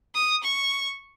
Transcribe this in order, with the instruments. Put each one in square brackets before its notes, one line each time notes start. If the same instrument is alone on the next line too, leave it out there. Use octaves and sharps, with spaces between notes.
[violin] D#6
C#6